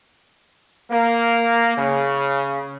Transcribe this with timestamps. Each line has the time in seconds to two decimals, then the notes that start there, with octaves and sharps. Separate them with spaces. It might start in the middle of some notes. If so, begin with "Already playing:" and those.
0.91 A#3
1.77 C#3